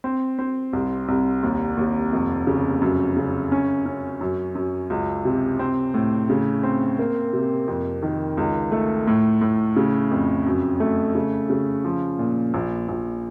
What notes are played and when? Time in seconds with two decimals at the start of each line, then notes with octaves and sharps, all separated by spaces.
0.04 C4
0.39 C4
0.73 C2
1.08 C2
1.43 D#2
1.77 D#2
2.12 F1
2.47 C#3
2.82 F#2
3.17 C#3
3.52 C#4
3.86 C#4
4.21 F#2
4.55 F#2
4.90 C#2
5.25 C3
5.59 C4
5.94 A2
6.30 C#3
6.63 C4
6.99 A#3
7.33 C3
7.68 F2
8.03 D#3
8.37 C#2
8.72 A3
9.07 A2
9.41 A2
9.76 C#3
10.11 F2
10.46 F#2
10.80 A3
11.15 C#3
11.50 C#3
11.84 F3
12.19 A#2
12.54 A#1
12.88 A#1